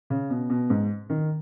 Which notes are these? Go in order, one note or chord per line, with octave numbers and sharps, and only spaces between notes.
C#3
B2
B2
G#2
D#3